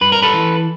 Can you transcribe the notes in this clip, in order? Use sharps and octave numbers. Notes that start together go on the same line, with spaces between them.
G2 B4
A#4
A4 B4
E3